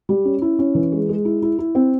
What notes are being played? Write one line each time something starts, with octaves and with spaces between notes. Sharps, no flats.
G3
C#4
E4
C#4
E3
G#3
G#3
E4
E4
E4
C4